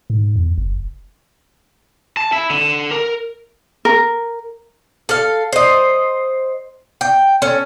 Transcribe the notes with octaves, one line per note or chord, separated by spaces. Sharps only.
G#2
E2
F#1
A5
E4
D3
A#4
A#4
A4 F5
C5 D#5
G5
C#4 A4